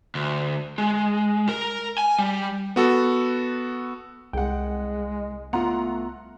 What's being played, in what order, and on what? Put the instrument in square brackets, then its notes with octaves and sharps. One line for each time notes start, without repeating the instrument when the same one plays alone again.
[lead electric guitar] D2
G#3
A#4
G#5
G3
[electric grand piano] B3 F#4 A4
[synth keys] C2 [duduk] G#3 [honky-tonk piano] G#4 F#5 [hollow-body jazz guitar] G5
[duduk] A3 [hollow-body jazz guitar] B3 F4 [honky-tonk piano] F#5 A#5 C6